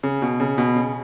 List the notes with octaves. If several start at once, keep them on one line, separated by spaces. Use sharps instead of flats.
C#3
B2
C#3
B2
C#3